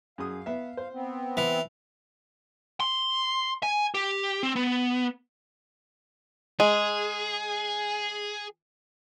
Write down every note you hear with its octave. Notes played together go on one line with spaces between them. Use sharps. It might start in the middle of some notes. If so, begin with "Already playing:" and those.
F#2 G#4 F5 D#6
B3 E5
C5
B3 C4
E3
C6
G#5
G4
C4
B3
G#3 G#4